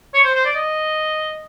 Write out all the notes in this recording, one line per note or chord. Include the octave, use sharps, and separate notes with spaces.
C#5
C5
C5
D5
D#5